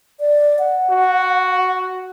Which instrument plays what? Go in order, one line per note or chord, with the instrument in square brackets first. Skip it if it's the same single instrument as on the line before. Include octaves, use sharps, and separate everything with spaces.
[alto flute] D5
F#5
[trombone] F#4